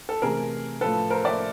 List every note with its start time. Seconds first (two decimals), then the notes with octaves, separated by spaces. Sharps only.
0.09 A4
0.22 C3 E3 A3 G#4 A#4
0.81 A2 F3 A3 A4 B4
1.10 A#4 C5
1.25 D5 E5